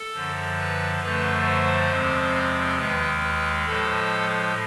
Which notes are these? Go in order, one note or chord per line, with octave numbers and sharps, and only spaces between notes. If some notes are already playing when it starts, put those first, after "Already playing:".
Already playing: A4
F#2 D3 F3
B4
F#2 D3 F3 A3 B4
C5
E2 C3 F3 G#3 C4
D#2 D#3 G#3 B4
B4
A2 F3 G#3 A4